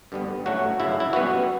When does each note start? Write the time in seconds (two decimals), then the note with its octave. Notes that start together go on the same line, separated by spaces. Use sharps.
0.12 G2 D3 G3 B3
0.46 A2 F#3 A3 C#4 F#4
0.80 G1 F#2 C#3 E4
1.00 E4
1.13 F#2 E3 G3 B3 F#4